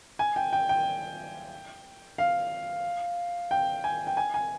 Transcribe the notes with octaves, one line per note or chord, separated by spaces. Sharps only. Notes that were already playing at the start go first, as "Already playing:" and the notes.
G#5
G5
G5
G5
F5
G5
G#5
G5
G#5
G#5